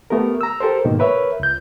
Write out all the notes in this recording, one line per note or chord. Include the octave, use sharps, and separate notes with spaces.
A3 B3 G4 A#4
A#5 E6
G4 A4 A#4 C5
G#2 B2 D#3 A#3
A#4 B4 C#5 E5
C#2 G6